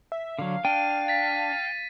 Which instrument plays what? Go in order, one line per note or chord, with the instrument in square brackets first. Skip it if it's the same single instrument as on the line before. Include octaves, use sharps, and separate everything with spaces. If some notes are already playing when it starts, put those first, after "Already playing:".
[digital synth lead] E5
[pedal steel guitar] D3 F#3 [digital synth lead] F5
[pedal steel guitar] D4 [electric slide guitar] G5 [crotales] D#7
[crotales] A6 B6